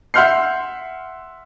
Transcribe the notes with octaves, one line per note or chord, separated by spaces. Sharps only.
E5 F#5 C6 F6 G6 C7